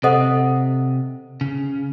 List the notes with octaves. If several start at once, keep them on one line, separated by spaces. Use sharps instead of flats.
C3 A4 C5 D#5 F#5
C#3